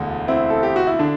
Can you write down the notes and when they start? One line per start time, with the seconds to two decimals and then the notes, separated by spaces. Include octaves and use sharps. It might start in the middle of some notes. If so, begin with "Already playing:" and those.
Already playing: E1 D2 D3
0.28 C4 E4
0.50 A4
0.63 G4
0.76 F#4
0.87 E4
0.99 D3 D4